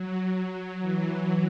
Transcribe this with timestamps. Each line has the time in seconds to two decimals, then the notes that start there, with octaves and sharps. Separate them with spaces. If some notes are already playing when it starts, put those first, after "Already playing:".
Already playing: F#3
0.17 F#3
0.80 E3